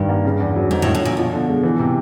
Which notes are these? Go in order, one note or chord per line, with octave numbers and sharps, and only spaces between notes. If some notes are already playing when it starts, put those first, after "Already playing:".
Already playing: G2 D#3 G3
A#3
C#3
E2
F#3
G#2 D3
A2
F#2
A2
A#2 F3
B2 F3
D3
G#3
E3
C3